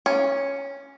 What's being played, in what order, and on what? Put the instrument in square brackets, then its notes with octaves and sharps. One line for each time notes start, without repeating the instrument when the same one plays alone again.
[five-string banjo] C#4